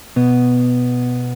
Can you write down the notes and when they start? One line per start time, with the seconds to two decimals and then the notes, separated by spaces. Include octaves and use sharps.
0.16 B2 B3